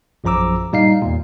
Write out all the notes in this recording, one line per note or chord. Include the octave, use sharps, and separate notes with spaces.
A#1 F#2 F3 A#5 D6 E6
A#2 G3 D#4 F5 C7
E2 A#2